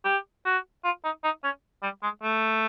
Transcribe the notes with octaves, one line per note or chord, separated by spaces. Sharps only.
G4
F#4
F4
D#4
D#4
C#4
G3
G#3
A3